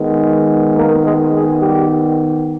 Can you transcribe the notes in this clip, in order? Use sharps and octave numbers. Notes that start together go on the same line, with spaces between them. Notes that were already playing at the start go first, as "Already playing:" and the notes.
Already playing: D#3 G#3 B3
A#3 A#4
G#3 G#4
G#3 G#4
G3 G4